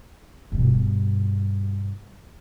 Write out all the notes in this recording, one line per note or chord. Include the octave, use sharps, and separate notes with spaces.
G2 B2